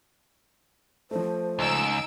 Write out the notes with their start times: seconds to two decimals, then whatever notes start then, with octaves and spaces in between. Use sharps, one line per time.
1.11 F3 A3 C5
1.59 C#2 D#4 E6 D7